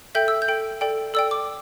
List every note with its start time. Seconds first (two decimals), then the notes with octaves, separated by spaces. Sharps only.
0.15 A4 E5 G5 G6
0.28 E6
0.42 G6
0.48 A4 G5
0.81 A4 D5 G5
1.14 A4 D5 G5 E6
1.31 D6